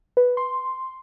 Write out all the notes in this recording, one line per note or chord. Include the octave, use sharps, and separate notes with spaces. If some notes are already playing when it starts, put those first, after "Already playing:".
B4
C6